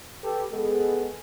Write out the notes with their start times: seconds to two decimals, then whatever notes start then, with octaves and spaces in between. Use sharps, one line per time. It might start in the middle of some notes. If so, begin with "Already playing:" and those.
0.23 G4 A4 B4
0.53 G#3 B3 G#4 A4